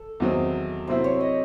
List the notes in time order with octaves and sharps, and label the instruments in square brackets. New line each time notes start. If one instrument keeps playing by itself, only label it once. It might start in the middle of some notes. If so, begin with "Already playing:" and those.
Already playing: [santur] A4
[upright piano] E2 D#3 F#3 C4 D#4
[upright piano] C3 F#3 C4 E4 [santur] C5
[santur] C#5
D#5